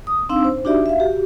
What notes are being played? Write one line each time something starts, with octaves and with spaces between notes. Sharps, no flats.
D#6
C4 D4 D#4 F5 E6
C5
D4 D#4 F#4 G4 D5 E5
E5 F5
F#4 G4